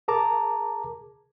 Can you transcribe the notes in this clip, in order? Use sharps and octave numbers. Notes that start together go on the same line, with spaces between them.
G#4 A#4 A5 A#5 D6